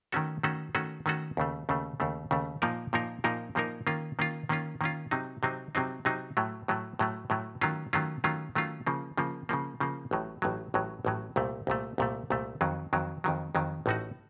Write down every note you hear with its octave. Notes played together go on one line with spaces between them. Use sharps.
D#3 A3 C#4 F#4 A4
D#3 A3 C#4 F#4 A4
D#3 A3 C#4 F#4 A4
D#3 A3 C#4 F#4 A4
D#2 C#3 A3
D#2 C#3 A3
D#2 C#3 A3
D#2 C#3 A3
A#2 F3 A#3 D#4 A#4
A#2 F3 A#3 D#4 A#4
A#2 F3 A#3 D#4 A#4
A#2 F3 A#3 D#4 A#4
D#3 A#3 C#4 F4
D#3 A#3 C#4 F4
D#3 A#3 C#4 F4
D#3 A#3 C#4 F4
C3 F#3 C4 D#4
C3 F#3 C4 D#4
C3 F#3 C4 D#4
C3 F#3 C4 D#4
A2 F#3 A3
A2 F#3 A3
A2 F#3 A3
A2 F#3 A3
D#3 F#3 A3 C#4 F4
D#3 F#3 A3 C#4 F4
D#3 F#3 A3 C#4 F4
D#3 F#3 A3 C#4 F4
C#3 F3 A#3
C#3 F3 A#3
C#3 F3 A#3
C#3 F3 A#3
A1 A2 F#3
A1 A2 F#3
A1 A2 F#3
A1 A2 F#3
C2 A#2 A3
C2 A#2 A3
C2 A#2 A3
C2 A#2 A3
F2 D#3 F#3
F2 D#3 F#3
F2 D#3 F#3
F2 D#3 F#3
A1 A2 A3 D#4 F#4